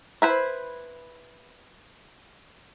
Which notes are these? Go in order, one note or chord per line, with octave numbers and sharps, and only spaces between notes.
E4 B4 C5